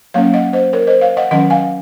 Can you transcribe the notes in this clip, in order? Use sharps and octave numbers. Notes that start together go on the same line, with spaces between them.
F#3 A#3 C#4 C#5 F5
D#5 F#5
C5 D#5
A#4 C#5
C5 D#5
C#5 F5
D#5 F#5
D#3 F#3 C#4 D#5 F#5
F5 G#5